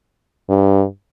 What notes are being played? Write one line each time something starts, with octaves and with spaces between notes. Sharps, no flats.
G2